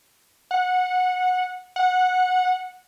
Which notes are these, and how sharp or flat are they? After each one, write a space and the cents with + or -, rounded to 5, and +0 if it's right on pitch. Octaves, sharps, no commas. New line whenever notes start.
F#5 -20
F#5 -15